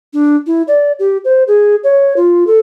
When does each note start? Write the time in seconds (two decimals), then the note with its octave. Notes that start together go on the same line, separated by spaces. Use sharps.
0.13 D4
0.47 E4
0.68 D5
0.99 G4
1.25 C5
1.48 G#4
1.84 C#5
2.17 F4
2.47 A4